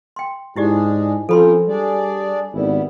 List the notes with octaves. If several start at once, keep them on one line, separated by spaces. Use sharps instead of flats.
G5 C6
G#2 G#3 D4 E4 G4 G#4 D5
F3 C4 C#4 A4 A#4 B5 C6
G3 D4 G#4 D5
G#1 G3 B3 E4